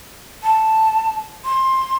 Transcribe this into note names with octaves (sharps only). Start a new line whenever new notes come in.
A5
C6